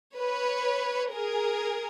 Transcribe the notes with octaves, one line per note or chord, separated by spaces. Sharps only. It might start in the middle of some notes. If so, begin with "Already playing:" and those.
B4 C#5
G#4 A#4